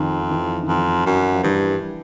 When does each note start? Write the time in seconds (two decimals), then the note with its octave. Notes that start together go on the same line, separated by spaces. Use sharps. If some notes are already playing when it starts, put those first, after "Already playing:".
Already playing: F2 D#3
0.21 F3
0.31 E3
0.63 D#3
0.68 F2 E3
1.06 F#2
1.33 F3
1.43 G2 E3